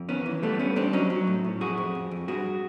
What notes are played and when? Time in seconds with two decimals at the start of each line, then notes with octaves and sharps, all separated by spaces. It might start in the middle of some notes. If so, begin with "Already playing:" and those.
Already playing: F2
0.09 D#3 B3 C#4
0.26 E3
0.42 G3 A3 B3
0.59 G2 B3 C#4
0.76 G3 C4 D4
0.93 F#3 C#4 D#4
1.10 F#3
1.27 A2
1.44 A2
1.61 F2 F#4 G#4
1.78 F2
1.95 F2
2.11 F2
2.28 G2 F#4 G#4